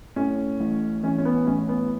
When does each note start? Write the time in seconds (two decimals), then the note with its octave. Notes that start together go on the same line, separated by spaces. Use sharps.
0.16 A2 C#4
0.60 A1
1.03 E3 C#4
1.18 C#4
1.25 B3
1.47 A1 C#4
1.69 B3